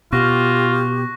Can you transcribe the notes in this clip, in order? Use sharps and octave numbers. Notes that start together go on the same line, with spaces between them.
B2 F4 G4 C#6 F#6 A#6